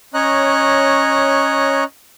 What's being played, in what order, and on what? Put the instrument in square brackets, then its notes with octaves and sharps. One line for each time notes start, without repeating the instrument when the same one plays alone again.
[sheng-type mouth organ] C#4 C#5 D#5 A#5 F#6